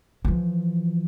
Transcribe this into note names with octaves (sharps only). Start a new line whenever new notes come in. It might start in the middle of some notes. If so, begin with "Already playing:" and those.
E3 F3